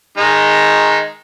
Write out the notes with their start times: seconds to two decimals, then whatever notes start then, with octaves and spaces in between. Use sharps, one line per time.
0.17 D#3 G#3 D#4